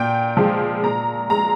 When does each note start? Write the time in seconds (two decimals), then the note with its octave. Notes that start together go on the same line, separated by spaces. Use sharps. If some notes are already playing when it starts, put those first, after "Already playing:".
Already playing: A#2 G5
0.37 F3 G#3
0.83 A#2 A#5
1.30 G#3 A#5